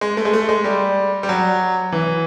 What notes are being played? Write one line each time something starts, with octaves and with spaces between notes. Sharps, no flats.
G#3
A3
G#3
A3
G#3
G3
G3
F#3
E3